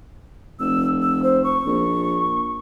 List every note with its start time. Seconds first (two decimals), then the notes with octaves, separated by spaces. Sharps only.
0.60 F1 E6
1.02 E6
1.23 C5
1.44 C#6
1.66 A#1